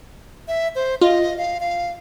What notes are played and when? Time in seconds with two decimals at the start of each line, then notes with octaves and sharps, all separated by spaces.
0.48 E5
0.75 C5
1.01 F4 D#5
1.38 F5
1.60 F5